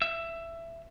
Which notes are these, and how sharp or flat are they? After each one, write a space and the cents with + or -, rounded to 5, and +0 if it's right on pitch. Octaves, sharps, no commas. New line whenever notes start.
E5 +15